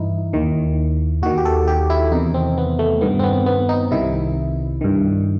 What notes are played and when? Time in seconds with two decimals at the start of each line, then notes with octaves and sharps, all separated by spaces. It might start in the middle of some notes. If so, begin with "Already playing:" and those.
Already playing: G2 E3 D#4 E4
0.33 D#2 D#3
1.22 D#2 D#3 F#4
1.38 G4
1.45 A4
1.67 G4
1.90 E4
2.12 E2 C3 D#3 D#4
2.34 C4
2.58 B3
2.79 A3
3.01 G2 D#3 B3
3.19 C4
3.23 B3
3.46 B3
3.69 D#4
3.91 C2 C3 D#3 E4
4.81 G2 D#3